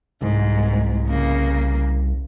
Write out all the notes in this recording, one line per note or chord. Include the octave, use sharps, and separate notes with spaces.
C2 G#2
C#3 A#3